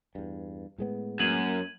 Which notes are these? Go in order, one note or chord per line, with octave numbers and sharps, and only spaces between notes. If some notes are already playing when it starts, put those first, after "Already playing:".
E2 G2
A2 G#3 B3
F#2 A#3 G#6 D#7 F#7